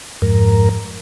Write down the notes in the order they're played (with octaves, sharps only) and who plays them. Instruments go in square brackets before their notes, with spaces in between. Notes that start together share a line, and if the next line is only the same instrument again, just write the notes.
[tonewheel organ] F2 G#2 A#4